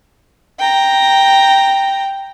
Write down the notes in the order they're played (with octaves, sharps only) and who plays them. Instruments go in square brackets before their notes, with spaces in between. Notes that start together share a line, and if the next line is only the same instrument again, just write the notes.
[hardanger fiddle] G5 A#5